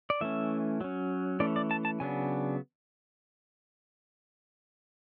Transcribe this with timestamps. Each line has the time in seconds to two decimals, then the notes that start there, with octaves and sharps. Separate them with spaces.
0.10 D5
0.21 E3 A3 C#4 E5
0.81 F#3 C#4
1.40 E3 A3 C#4 D5
1.56 D5
1.71 A5
1.85 A5
2.00 C#3 F#3 B3 D4 G#5